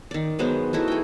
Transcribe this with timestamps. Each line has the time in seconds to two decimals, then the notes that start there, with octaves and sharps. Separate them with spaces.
0.11 D#3 D5
0.39 F#3 G#3 B3 C5
0.73 A3 D#4 E4 F#4
0.88 G#4 G5